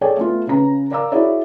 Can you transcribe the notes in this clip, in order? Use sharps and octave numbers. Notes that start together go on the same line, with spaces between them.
G#4 A4 C#5 D5 G5 G#5
A3 B3 F4
C#3 C#4 B4 A#5
A#4 D5 F5 A#5 D6 E6
E4 F#4 G#4 C#5 D5 E5